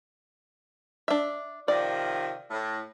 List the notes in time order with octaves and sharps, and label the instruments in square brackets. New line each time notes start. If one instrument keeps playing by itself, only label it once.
[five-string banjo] D4 E5
[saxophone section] C3 D#3 F3 [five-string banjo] D5
[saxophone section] A2